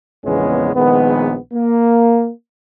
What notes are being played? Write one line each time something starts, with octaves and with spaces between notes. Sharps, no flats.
A#1 E2 C#3 G#3 B3 C#4
A#1 D#3 G#3 B3
A#3